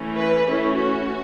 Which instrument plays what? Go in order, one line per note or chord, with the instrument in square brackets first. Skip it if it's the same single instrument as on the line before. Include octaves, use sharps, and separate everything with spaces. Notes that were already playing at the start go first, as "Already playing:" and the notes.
Already playing: [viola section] E3 A3 C#4
B4
E3 A3 C#4 E4
F#4